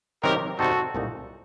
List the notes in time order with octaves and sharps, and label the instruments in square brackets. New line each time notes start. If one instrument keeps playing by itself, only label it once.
[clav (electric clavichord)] C3 D#3 F#3 C4 F#4 [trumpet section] G4 A#4
[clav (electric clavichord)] C3 G3 C4 D#4 [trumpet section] F#4 A4
[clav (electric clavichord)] C2 A#2 A3 D#4